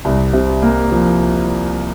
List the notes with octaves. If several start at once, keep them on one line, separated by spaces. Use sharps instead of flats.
C2
C3
A#3
F3